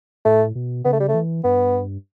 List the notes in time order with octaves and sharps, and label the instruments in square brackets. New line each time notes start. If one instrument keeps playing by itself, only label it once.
[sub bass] A2 [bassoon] A3
[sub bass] B2
[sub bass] C#3 [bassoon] B3
[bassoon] A3
G3
A3
[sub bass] E3
[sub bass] G2 [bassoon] B3